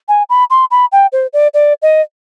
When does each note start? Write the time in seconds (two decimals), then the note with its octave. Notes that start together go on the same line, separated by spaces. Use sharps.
0.08 G#5
0.30 B5
0.50 C6
0.71 B5
0.92 G5
1.12 C5
1.33 D5
1.54 D5
1.82 D#5